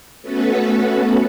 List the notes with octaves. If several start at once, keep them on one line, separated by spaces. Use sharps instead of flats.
A3 B3 C#4 F#4 A4 B4